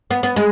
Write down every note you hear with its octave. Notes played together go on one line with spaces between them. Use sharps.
B3
B3
G#3